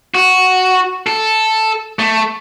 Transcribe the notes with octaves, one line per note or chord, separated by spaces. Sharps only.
F#4
A4
A3